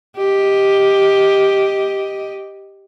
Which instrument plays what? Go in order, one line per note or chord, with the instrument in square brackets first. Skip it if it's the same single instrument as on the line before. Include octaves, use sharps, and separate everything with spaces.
[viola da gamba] G4 D#5